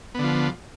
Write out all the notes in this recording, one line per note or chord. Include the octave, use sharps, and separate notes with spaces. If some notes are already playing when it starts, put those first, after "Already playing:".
D3 F3 B3